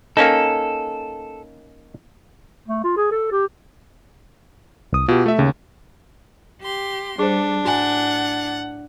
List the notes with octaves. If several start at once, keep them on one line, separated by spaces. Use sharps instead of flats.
A#3 C#4 D#4 A4
A3
F4
G#4
A4
G4
C2 D#6
B2 F4 G4
A3 E5
D#2 C#3
G4 C6
G3 D4 G#4 C5
A2 F#4 F#5 G#5 A6